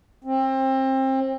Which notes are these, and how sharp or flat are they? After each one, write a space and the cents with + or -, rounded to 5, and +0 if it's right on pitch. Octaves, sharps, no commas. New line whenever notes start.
C4 +25